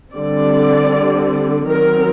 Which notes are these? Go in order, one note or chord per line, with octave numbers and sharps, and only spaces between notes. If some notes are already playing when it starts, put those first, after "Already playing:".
D3 G3 C4 D5
D#3 F#3 C4 A#4